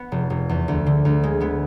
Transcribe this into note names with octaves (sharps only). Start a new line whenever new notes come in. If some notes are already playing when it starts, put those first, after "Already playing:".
Already playing: B3
F1
F1
E2
D2
D3
D2
G#3
G#3 B3